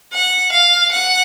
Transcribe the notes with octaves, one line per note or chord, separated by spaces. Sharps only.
F#5
F5
F#5